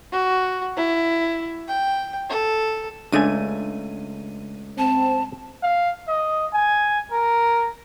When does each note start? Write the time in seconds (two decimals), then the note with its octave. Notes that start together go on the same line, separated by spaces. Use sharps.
0.12 F#4
0.77 E4
1.68 G5
2.30 A4
3.12 C#2 G#3 A3 D4 G#5 D#7
4.78 C4 A5
5.63 F5
6.08 D#5
6.53 G#5
7.12 A#4